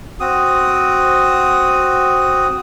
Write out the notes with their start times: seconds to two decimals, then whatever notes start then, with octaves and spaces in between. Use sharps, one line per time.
0.20 C4 F#4 D#6